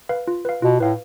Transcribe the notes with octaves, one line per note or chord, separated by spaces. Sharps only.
B4 F5
F4
B4 F5
B2 F4
A2 B4 F5